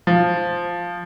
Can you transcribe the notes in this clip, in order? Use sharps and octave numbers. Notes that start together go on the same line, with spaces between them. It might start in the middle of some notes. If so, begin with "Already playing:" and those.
F3